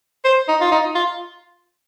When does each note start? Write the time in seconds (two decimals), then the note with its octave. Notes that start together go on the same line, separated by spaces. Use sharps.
0.24 C5
0.48 D#4
0.61 F4
0.71 D#4
0.95 F4